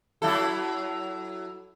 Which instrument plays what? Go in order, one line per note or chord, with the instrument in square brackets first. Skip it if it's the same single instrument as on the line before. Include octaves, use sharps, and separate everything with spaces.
[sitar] F#3 E4 A4